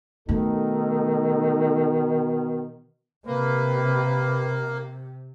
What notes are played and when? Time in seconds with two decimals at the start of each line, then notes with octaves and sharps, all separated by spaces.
0.29 B2 D#3 A3 D#4 A4
3.27 C3 A#3 B4